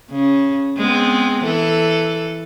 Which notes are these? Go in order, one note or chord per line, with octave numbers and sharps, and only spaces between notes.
C#3
G#3 B3 C4
E3 A4